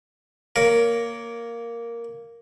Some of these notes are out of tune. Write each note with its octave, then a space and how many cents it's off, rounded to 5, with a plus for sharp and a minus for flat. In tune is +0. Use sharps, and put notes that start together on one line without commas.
A#3 +0 A#4 +0 C#5 +20